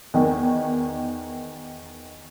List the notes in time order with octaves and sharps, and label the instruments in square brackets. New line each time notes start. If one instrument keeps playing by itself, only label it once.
[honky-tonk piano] E2 D#3